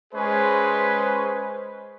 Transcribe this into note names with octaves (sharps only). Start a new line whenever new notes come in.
G#3 C#4 G#4 B4 C5